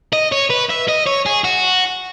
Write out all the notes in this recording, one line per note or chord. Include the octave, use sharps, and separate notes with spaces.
D#5
C#5
B4
E5
D#5
C#5
G#4
F#4